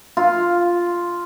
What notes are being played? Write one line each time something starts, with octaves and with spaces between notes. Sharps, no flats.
F4